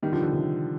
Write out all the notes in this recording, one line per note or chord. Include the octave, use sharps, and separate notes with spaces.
D#3 G3
D3 F3
D3
C3 D#3